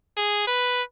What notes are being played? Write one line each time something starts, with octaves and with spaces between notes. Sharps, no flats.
G#4
B4